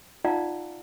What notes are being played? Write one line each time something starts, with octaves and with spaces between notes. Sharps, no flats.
D#4 F4 D5 F5 F#5 A#5